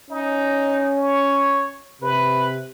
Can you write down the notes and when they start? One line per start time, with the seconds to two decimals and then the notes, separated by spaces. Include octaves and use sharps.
0.11 C#4 D#4
0.97 C#5
2.02 C3 B4